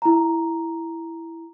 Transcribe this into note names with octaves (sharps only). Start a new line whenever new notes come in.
E4 A#5